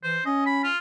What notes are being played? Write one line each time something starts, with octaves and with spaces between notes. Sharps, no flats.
E3 C5
C#4 D#5
B5
F4